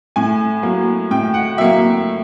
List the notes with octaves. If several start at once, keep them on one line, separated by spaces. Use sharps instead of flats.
A2 G#5
F#3 A#3
A2 G5
F#5
F#3 A#3 E5